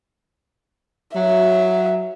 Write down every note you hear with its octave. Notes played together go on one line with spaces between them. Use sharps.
F#3 E5